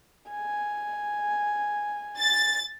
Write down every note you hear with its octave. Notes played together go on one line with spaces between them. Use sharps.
G#5
A6